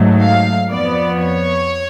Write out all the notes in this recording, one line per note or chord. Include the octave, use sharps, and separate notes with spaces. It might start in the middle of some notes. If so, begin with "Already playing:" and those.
Already playing: G#2 F#3 A3
F5
F2 F3 B3 D5
C#5